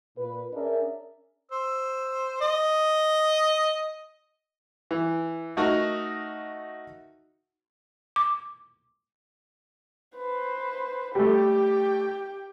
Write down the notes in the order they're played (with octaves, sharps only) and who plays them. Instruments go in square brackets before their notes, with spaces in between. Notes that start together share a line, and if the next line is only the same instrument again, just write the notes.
[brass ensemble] A#2 B4
C#4 D4 G#4 A#4 D5 E5
[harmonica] C5 E6
D#5
[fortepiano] E3
A3 D#4 F#4 A#4 D#5
[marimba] D6
[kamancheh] B4 C5
[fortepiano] G3 A3 [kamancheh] G4 G5